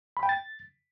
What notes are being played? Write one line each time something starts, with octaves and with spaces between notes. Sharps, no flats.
B5
G5
A6